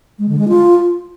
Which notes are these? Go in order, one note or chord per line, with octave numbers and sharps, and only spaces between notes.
G#3
D3
G#3
F4